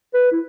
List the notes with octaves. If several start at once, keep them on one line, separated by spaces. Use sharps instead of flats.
B4
E4